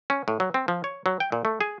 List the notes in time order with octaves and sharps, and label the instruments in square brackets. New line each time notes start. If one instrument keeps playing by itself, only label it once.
[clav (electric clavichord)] C#4
A2
F#3
C4
F3
C#5
F#3
G5
A#2
A3
G#4